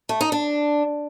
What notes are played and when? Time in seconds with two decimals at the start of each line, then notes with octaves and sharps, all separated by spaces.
0.09 A3
0.21 D#4
0.32 D4